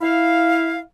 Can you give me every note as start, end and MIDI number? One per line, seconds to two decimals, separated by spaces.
0.01 0.81 64
0.01 0.81 77